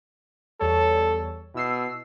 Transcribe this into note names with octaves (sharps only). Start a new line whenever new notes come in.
E2 G3 A4 C#5
B2 E4 E6 C7